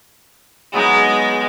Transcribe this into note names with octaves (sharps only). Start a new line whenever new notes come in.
F#3 G#3 B3 D#4